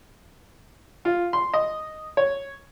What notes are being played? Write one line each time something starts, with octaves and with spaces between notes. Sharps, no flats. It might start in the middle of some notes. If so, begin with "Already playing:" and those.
F4
C6
D#5
C#5